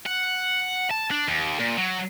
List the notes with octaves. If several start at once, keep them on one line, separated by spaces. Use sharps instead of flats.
F#5
A5
D4
D#2
A#2
F#3